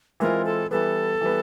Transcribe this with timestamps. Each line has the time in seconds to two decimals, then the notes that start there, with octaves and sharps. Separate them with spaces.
0.20 E3 G#3 C4 F4 A#4
0.45 A4
0.71 E3 G3 B3 A4
1.21 E3 G3 B3